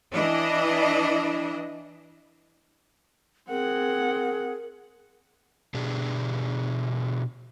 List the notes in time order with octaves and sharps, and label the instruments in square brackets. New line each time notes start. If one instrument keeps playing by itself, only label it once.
[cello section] E3 D4 E4 D#5
[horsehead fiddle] C4 F#5 [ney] G#4 [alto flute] A#4
[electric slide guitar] B2 D4 G4 G#4